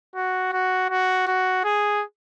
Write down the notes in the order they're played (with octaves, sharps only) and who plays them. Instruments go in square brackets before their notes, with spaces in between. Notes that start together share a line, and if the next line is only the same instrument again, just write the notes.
[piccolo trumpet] F#4
F#4
F#4
F#4
G#4